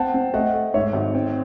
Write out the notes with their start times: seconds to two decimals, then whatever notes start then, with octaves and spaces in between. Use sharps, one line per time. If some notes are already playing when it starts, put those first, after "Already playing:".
Already playing: C4 F#5 A5
0.14 C4
0.34 A3 D#5 F#5
0.54 A3
0.74 G#2 C#5 E5
0.93 G#1
1.15 C4